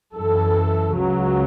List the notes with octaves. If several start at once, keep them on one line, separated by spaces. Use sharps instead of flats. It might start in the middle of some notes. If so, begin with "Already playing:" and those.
F#2 E3 A4
C#2 C#3 F#3